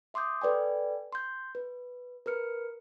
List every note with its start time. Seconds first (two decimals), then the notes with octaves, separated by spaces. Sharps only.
0.14 E5 C6 D6 D#6 G6
0.42 A4 B4 D5 G5 G#5
1.12 C6 G6
1.55 B4
2.26 A#4 B4 F6 C#7